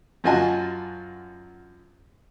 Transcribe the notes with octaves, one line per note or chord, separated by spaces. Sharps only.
F#2 F4 F#4 D#5 G#5 A5